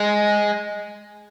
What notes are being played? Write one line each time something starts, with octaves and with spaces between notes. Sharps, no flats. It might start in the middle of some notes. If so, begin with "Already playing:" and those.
Already playing: G#3